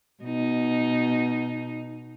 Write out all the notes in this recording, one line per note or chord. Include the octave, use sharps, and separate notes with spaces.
B2 D#4